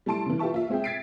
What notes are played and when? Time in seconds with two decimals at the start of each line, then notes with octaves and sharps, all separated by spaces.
0.06 G3 A3 E4 A5 C6 D7
0.26 C#3 E3
0.39 F4 G4 B4 E5 A5 C#6
0.52 A#3 F4 E5
0.70 G#3 C4 G#4 E5 G5
0.84 G#6 A6 B6 C7 D7